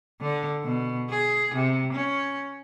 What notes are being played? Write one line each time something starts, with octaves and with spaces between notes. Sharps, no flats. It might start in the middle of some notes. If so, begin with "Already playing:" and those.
D3
B2
G#4
C3
C#4